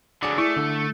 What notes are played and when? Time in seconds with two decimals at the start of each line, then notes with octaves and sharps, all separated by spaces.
0.23 D3 F#3 G#4 D5
0.38 A3 E4
0.57 D3